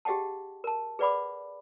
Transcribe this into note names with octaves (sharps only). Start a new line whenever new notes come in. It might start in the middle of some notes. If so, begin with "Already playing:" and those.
G4 G#4 D#5 F#5 G5 A5
A#4 A5
G#4 B4 D5 F#5 B5 D6